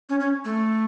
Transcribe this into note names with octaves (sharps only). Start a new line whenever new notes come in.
C#4
C#4
A3